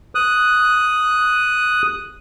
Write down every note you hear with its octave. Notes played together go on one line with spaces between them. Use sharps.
D#6 F#6